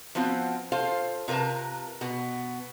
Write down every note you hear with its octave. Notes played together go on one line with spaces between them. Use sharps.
F3 B3 C4 F4 F#4
F4 A4 C5 F5
C3 F4 A#4 B4 A5
B2 B3